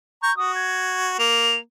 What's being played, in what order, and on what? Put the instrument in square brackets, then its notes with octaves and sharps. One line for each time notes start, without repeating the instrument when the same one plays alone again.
[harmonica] A#5 C#6 [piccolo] G6
[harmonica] F#4 [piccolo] D#6
[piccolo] G#6
[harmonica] A#3 [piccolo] F7